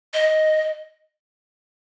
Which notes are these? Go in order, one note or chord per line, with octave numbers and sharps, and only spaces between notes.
D#5